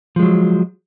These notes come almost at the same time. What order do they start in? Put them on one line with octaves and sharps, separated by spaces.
F3 G#3 F#3